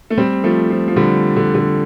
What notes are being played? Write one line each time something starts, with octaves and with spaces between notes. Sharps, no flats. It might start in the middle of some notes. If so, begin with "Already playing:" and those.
A3
G3 C4
F3 A3
F3
F3
D3 G3
D3
D3